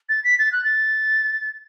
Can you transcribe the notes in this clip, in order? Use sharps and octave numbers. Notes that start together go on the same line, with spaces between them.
A6
B6
A6
F#6
A6